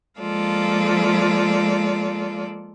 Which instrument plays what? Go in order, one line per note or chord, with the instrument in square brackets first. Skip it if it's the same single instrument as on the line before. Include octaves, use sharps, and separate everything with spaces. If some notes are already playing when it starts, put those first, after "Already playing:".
[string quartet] F3 G#3 A#3 F4 A4 D5